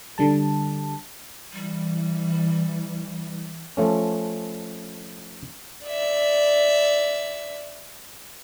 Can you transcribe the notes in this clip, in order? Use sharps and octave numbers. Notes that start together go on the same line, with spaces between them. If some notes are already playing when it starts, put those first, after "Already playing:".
D3 G3 A5
E3 G3
F3 A3 C#4
D5 E5